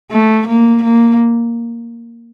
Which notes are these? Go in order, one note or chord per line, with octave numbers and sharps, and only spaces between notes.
A3
A#3
A#3